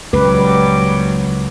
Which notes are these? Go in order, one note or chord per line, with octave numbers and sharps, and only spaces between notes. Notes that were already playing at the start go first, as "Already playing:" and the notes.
C#2 A#2 F#3 G3 B4 D6